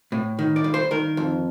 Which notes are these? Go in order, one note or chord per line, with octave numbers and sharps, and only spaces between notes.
A2
D#3
D5
G2
C5
D#3 A#4
F2